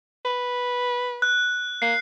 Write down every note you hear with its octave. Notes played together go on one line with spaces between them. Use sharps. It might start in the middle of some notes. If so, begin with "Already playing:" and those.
B4
F#6
A#3 C7